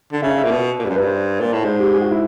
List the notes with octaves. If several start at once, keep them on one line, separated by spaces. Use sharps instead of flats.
D3
C#3 E5
F5
E5
A#2
B2
A#2
G2
F#2
G2 B4
C5
A#2
A2
G#2 C5
G4
G#4
F#4
E4